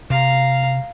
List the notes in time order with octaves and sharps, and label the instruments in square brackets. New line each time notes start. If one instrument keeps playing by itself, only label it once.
[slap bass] C3 [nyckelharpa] F5 A#5